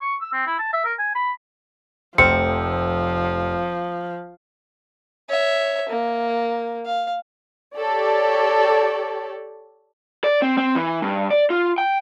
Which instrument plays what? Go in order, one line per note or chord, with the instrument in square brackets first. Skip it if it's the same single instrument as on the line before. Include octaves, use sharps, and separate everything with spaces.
[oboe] C#6
E6
C4
E4
A5
E5
A#4
G#5
B5
[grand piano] F1 A3 F6 [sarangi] F3 [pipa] C4 [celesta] C#7
[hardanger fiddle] C#5 E5
A#3
F5
[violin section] G4 A4 C#5 D5
[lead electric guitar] D5
C4
C4
E3
G2
D5
F4
G5